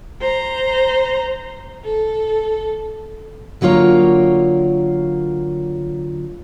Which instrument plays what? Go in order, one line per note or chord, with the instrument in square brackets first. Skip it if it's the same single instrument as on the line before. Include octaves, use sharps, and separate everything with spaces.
[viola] C5 A#5
A4
[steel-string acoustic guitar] D3 F#3 A#3 F4 C#5